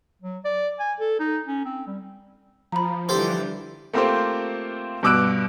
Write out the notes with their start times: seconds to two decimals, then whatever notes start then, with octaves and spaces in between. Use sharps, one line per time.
0.22 F#3
0.45 D5
0.79 G#5
1.00 A4
1.20 D#4
1.46 C#4
1.65 C4
1.87 G3
2.72 F3 A#5 B5
3.09 D3 E3 G3 G4 A4 C5
3.93 A3 A#3 C4 F4 G4 C5
5.03 G2 B2 D6 E6 F#6 D7